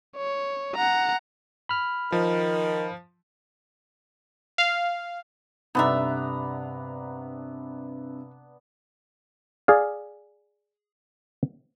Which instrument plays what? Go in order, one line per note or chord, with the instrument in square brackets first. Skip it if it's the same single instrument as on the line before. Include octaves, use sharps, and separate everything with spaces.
[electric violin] C#5
F#5 A#5
[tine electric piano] B5 F6
[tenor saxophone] D#3 [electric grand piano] F3
[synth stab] F5
[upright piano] G2 C3 [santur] B3 D4 A#5 [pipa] D#4 A4 E5
[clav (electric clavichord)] G#4 D5 F5